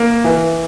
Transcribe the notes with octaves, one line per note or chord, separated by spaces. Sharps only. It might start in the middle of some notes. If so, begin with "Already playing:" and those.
Already playing: A#3
E3